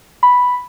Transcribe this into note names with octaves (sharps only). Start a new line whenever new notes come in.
B5